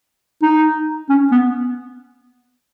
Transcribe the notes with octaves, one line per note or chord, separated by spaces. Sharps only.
D#4
C#4
B3